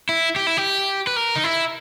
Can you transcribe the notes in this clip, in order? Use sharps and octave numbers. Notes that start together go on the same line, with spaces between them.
E4
G4
E4
G4
B4
A#4
D#4
E4